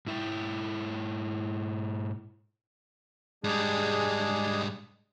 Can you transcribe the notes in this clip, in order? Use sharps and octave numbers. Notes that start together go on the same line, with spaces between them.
G#2 E4 E5 G5
G#2 G3 G#3 D4 G#4